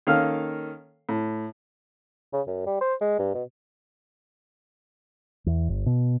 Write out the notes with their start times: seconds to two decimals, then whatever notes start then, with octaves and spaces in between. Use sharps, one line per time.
0.07 D#3 A#3 C#4 A4 F5 F6
1.09 A2
2.33 C#3
2.47 F#2
2.66 G3
2.81 C5
3.01 G#3
3.19 G2
3.34 B2
5.46 E2
5.69 G1
5.86 B2